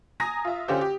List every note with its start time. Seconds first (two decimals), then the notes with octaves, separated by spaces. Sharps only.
0.20 G#5 A#5 D#6 A#6
0.45 F4 E5
0.68 D3 C#4 F4 G4 C5
0.81 G4